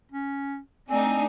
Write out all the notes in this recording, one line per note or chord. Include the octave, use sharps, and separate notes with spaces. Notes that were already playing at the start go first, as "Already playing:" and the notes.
C#4
A3 C4 D4 D#4 G#5